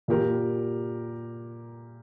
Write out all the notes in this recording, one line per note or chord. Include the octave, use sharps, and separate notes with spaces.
A#2 A#3 G4 A#4